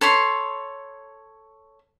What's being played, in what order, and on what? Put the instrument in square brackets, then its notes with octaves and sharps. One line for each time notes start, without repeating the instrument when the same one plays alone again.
[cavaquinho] A4 C#5 B5 C6